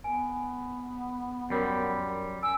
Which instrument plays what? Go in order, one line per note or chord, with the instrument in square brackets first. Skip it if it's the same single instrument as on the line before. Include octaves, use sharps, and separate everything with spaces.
[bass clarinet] B3 [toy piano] G#5
[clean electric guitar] F#2 G3 [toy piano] F#4 A#4 C#5
[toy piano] G#5 [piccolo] E6